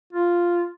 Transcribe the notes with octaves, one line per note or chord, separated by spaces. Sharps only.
F4